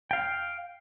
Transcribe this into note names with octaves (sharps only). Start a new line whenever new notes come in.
F5 G5